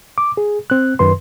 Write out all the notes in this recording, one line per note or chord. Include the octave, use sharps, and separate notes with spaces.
D6
G#4
C4 F#6
F#2 D#3 B4 C6